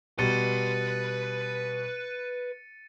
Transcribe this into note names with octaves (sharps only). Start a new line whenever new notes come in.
B2 G3 B4 C6 A6 C#7 D#7